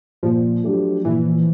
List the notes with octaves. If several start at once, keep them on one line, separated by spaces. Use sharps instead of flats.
A#2 F3
F#3 A3 D4 G4
A#2 E3